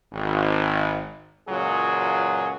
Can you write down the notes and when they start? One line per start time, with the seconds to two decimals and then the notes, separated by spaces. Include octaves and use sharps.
0.13 G#1
1.49 C#2 A#2 F#3 F4 G#4